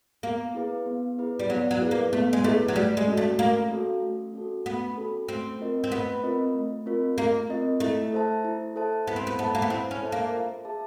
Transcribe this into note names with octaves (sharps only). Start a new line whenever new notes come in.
A#3 B3
E4 G#4 B4
B3
E4 G#4 B4
G3
F#3 B3
F#3
E4 G#4 B4
A#3
A3 B3
G#3
A3 E4 G#4 B4
F#3
G3 A3
G#3
C#4 F#4 A4
A3
A3 A#3
C#4 F#4 A4
A3
C#4 F#4 A4
A3 B3
C#4 F#4 A4
A3 C4
C4 F4 A#4 D#5
C4
A3 B3
C4 F4 A#4 D#5
A3
C4 F4 A#4 D#5
A3 A#3
C4 F4 A#4 D#5
A3 E4
A4 C5 E5 A5
E4
A4 C5 E5 A5
B3 E4
C4
B3
B3 A4 C5 E5 A5
A#3
B3
C4 E4
C#4
A4 C5 E5 A5
A#3
F4
G#4 C5 E5 A5